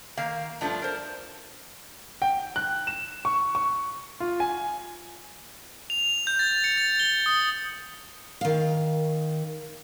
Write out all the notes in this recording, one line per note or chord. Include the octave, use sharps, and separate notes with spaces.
D#3 A#3 F5
G2 F3 A3 D4
A#4 C5
G5
F#6
E7
C#6
C#6
F4
G#5
F7
G6
A6
C#7
A6
G7
D#6
D#3 F5